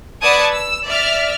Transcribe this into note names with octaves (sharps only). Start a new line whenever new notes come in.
B4 D5 F#5 A5 D#6 G#6
E6
D5 E5 F6